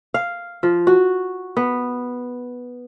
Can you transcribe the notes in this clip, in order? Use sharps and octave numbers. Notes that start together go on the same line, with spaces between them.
F5
F3
F#4
B3